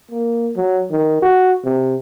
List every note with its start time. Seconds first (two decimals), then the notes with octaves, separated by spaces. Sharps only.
0.11 A#3
0.56 F#3
0.91 D#3
1.22 F#4
1.65 C3